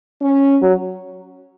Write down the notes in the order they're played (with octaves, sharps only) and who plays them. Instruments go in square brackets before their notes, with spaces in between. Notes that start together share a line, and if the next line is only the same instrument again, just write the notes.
[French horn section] C#4
[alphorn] F#3